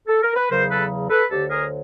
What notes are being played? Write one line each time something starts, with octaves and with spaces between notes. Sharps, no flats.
A4
A#4
B4
E2 C#3 F#3 A#4 C5
A4 B4
A4 B4
D2 D3 F#3 G4 A4
G#4 A#4